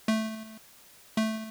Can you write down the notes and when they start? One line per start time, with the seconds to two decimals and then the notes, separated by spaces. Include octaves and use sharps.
0.08 A3
1.17 A3